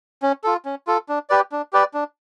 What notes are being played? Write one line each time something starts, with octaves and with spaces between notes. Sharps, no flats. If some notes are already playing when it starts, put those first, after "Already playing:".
C#4
F4 A4
C#4
F4 A4
D4
G4 B4 D5
D4
G4 B4 D5
D4